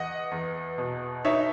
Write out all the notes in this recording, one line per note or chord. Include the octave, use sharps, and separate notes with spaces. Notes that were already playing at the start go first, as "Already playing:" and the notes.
Already playing: E2 D#5 F#5
E2
B2
D#4 C#5 E5